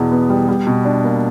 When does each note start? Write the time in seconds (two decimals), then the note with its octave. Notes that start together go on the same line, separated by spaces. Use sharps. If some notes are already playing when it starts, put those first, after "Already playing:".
Already playing: E2 B2
0.11 B3
0.30 G3
0.49 G3
0.67 B2
0.85 D4
1.04 A#3